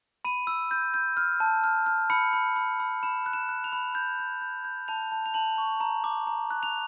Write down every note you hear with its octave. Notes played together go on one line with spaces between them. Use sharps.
B5 D#7
E6
G6
G6
F6
A5
F6
F6
B5 C#7
B5
B5
B5
B5 E7
F#6
E7
F#6
F7
B5
G6
G6
G6
G6
A5 F7
A5
F7
A5 F#7
C#6
A#5
D6
A#5
F#6
F7